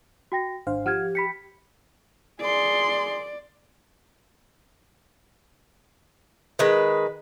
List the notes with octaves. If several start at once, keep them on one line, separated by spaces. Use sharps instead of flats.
F#4 G5 A#6
G#1 D4 C5 F5
F3 G4 F#5 F6 G#6
G5 B5 B6 C#7
G#4 D5 C6
D#3 G#3 B4